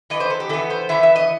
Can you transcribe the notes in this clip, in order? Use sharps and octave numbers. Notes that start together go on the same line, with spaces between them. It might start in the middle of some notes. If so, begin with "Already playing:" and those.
E3 B3 D#5
C5
A4
G4
E3 B3 A4
C5
E3 B3 E5
E5
D#5